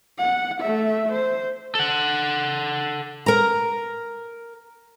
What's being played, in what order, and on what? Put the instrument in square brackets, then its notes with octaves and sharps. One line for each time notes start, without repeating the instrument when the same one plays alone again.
[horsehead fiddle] F#5
A3 E5
C5
[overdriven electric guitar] A4 F#5
[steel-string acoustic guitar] A#4 A#5